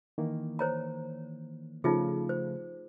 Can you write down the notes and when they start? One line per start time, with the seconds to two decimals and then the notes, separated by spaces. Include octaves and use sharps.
0.18 D#3 E3 A#3
0.59 C5 C#5 A#5
1.84 C#3 F3 A3 D#4 F4 G#4
2.29 C5